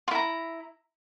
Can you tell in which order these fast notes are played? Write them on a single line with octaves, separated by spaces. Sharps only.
F4 E4 A#5